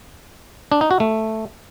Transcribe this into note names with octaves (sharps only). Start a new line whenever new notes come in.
D4
D#4
F#4
A3